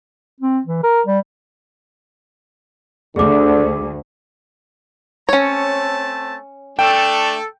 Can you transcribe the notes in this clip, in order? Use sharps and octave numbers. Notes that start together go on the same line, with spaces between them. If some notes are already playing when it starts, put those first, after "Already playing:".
C4
E3
A#4
G3
D2 D3 G#4 D6
A3 C4 C#4 C#5 A5
A3 D4 A4 G5